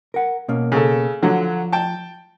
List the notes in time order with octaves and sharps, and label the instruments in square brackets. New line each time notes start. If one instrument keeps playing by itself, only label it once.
[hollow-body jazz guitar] A#4 F#5
B2 A#3 C#4
[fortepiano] C#3 A4
[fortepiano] D3 F#3 [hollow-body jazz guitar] F3
[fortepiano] G5 A5